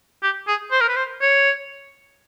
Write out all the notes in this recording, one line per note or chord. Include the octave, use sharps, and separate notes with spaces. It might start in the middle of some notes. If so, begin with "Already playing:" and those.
G4
G#4
C5
A#4
B4
C5
C#5